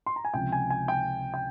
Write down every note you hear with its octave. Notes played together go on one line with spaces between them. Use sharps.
C6
A#5
G#5
C#2 C3 F3 G5
G#5
G#5
G5
G5